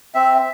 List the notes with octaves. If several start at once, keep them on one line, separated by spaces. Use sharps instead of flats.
C4 E5